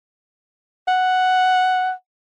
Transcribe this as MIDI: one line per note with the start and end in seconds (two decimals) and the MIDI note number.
0.88 1.92 78